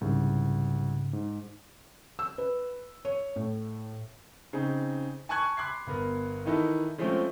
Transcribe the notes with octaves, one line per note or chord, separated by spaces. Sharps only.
C2 G#2 C#3
G#2
E6
B4
C#5
A2
C#3 C4 D#4 G#4
G#5 A5 C#6 F#6 G#6
B5 C6 D6 F#6 G#6 C7
G1 B3 A#4
D#3 E3 D#4 E4 A4
F3 G#3 A3 C4 C#4 F4